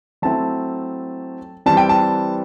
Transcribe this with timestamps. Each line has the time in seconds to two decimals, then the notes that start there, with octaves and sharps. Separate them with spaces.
0.22 F#3 A3 C4 E4 A5
1.66 E3 G3 C4 A5
1.77 G5
1.89 A5